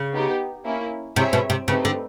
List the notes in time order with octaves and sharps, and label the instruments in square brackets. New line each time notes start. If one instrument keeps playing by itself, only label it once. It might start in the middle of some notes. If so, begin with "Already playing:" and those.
Already playing: [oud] C#3
[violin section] B3 D#4 G4
A#3 C#4 E4
[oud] C3 [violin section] C4 E4 G#4 C#5 E5
[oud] B2
C3
[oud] C#3 [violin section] A3 C4 D#4 G4 B4
[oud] D3